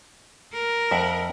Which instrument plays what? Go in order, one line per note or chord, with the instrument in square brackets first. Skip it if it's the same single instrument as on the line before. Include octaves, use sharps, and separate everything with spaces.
[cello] A#4
[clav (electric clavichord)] F2 E5 F#5